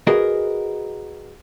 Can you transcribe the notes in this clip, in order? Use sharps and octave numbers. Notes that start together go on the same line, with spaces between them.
F#4 G#4 A#4 B4 D#5